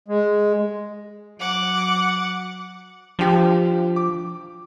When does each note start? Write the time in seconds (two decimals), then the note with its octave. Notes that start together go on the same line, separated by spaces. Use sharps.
0.08 G#3
1.40 F#3 F#5 D6
3.19 F3 D4 G4
3.96 D6